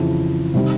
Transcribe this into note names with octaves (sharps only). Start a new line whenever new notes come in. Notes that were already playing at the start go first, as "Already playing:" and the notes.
Already playing: F2 C#3 E3
C3 D#3 G3